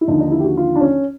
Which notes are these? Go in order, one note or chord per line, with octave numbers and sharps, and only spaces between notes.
E4
D#2 D3 F3 D#4
D#4
E4
G4
F#4
F4
D4
C#4